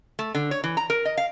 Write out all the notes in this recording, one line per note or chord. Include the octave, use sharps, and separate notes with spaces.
A3
D3
C#5
E3
A#5
A#4
D#5
F5